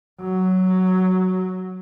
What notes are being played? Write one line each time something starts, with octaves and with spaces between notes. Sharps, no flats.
F#3